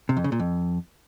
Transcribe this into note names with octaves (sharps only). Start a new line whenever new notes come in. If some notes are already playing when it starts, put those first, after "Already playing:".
C3
F2
C#3
A#2
F2